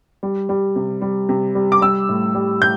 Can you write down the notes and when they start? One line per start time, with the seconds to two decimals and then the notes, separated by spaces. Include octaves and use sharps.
0.23 G3
0.49 G3
0.76 C3
1.02 G3
1.29 C3
1.55 G3
1.72 D6
1.81 G3 E6
2.09 A2
2.35 G3
2.61 A2 G6